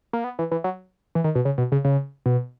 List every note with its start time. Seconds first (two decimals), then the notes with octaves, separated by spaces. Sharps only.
0.13 A#3
0.24 B3
0.39 E3
0.51 E3
0.64 F#3
1.15 E3
1.24 D#3
1.35 B2
1.45 C#3
1.58 B2
1.72 C#3
1.85 C#3
2.26 B2